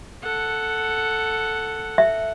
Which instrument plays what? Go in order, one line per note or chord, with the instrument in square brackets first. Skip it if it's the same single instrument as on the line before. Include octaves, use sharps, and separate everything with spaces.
[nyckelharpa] A4 F#5
[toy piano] E5